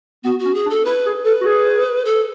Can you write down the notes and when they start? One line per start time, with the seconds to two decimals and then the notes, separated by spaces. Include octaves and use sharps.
0.24 B3 F#4
0.39 F#4
0.45 C#4
0.55 G#4
0.65 D4
0.70 A4
0.85 E4 B4
1.06 G#4
1.25 A4 B4
1.41 F#4
1.45 G#4
2.05 A4